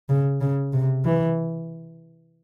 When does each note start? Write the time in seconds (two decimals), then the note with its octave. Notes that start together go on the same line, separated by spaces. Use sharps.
0.09 C#3
0.41 C#3
0.73 C3
1.05 E3